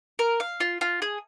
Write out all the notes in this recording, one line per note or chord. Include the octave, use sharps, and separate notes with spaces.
A#4
F5
F4
F4
G#4